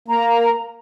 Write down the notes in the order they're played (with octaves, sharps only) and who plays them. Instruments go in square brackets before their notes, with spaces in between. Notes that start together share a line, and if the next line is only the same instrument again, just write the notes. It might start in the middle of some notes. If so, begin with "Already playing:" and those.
[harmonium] A#3 [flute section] A#5